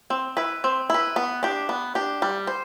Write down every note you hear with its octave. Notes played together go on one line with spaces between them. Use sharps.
C4
E4 B4
C4
E4 B4
B3
D4 G4
B3
D4 G4
G3
C5